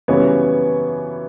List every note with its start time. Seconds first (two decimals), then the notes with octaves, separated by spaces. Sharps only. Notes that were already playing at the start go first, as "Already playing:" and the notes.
0.08 F#2 C#3 E3 G3 B3 C#5